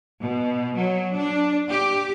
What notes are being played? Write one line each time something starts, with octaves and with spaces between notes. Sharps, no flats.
B2
F#3
D4
G4